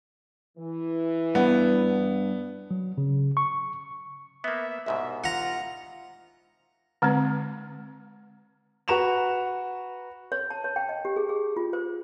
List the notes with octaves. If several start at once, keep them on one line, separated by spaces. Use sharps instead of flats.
E3
G2 B3
F#3
C#3
C#6
A#3 B3 E5
C2 G#2 B2 E5
F4 F#5 A#5
D3 G#3 C4 B4
F#4 B4 A#5 C#6 E7 F7
C#5
A5
C#5
G5
D#5
G4
G#4
G#4
F4
C5